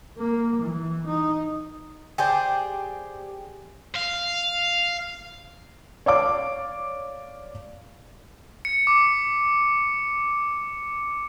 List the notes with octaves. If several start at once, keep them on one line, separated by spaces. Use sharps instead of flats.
A#3
E3
D#4
G4 G#4 C5 D5
F5
C#5 D5 F5 D6
C#7
D6